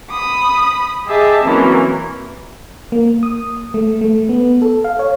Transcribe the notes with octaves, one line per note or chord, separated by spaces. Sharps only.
B5 D#6
G4 G#4 D#5 E5 A5
E3 F#3 A#3 C4 C#4
A#3
D#6
A3
A3
B3
A4
F5
C#5